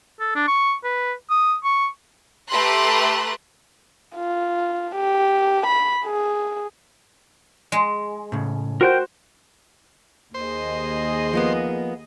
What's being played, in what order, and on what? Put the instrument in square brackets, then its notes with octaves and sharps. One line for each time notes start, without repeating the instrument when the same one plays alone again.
[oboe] A4
D4
C#6
B4
D#6
C#6
[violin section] A3 G4 B4 A#5 C6 F#6
[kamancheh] F4
G4
B5
G#4
[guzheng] G#3
[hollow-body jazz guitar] A2 C#3
[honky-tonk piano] F#4 C5 [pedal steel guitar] A#4 G5 G6
[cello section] D#2 G#4 D#5 [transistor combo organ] C5
[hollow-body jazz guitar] F3 A#3 B3